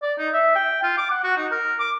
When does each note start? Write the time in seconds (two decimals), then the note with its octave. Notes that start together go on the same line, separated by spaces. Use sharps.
0.03 D5
0.19 D#4
0.34 E5
0.56 G5
0.83 F4
0.98 D6
1.11 F#5
1.24 F#4
1.37 D#4
1.51 A#4
1.80 D6